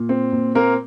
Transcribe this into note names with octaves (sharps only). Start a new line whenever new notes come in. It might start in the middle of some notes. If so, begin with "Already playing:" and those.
Already playing: A#2
C4
A#2
A#3 C4 A#4